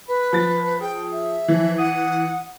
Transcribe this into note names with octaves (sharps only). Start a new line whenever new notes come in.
B4 B5
F3 A6
G#4 G5
E5
E3 F3
F#5 D#6